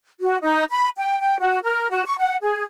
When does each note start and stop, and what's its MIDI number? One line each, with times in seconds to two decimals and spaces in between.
0.20 0.37 66
0.41 0.64 63
0.71 0.88 83
0.98 1.18 79
1.20 1.37 79
1.40 1.59 66
1.64 1.90 70
1.90 2.03 66
2.05 2.16 85
2.19 2.36 78
2.41 2.63 68